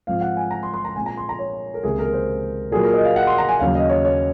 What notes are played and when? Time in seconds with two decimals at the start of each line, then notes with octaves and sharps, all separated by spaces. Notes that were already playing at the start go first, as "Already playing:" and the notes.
0.07 G#2 F3 C4 F5
0.21 F#5
0.37 G#5
0.51 A#5
0.63 C6
0.74 C6
0.85 A#5
0.95 A#2 G#3 C4 G#5
1.06 A#5
1.17 C6
1.29 A#5
1.39 C#5
1.74 A#4
1.83 C#2 C3 D#3 A#3 G#4
1.99 A#4
2.13 C5
2.71 A#2 F#3 A#3 G#4
2.83 A#4
2.94 D#5
3.05 F5
3.16 F#5
3.27 C6
3.38 A#5
3.49 G#5
3.60 D#2 C#3 F#3 F5
3.75 D#5
3.89 C#5
4.05 C#5